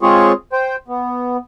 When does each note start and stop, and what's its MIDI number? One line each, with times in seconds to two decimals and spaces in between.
0.01 0.32 56
0.01 0.32 60
0.01 0.32 65
0.01 0.32 68
0.01 0.32 73
0.52 0.76 72
0.52 0.76 79
0.88 1.37 59